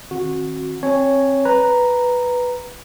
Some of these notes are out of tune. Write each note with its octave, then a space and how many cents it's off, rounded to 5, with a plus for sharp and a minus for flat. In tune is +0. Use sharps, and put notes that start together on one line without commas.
D#3 +0 C4 +40 F#4 -15
C4 +35 C#5 +0 G#5 +25
B4 +0 A#5 +0